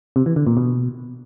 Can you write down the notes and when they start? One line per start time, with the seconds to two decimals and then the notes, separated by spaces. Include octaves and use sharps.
0.16 C3
0.26 E3
0.36 D3
0.47 A#2
0.57 B2